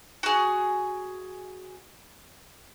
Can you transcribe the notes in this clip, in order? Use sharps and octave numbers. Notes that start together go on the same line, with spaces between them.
F#4 G#4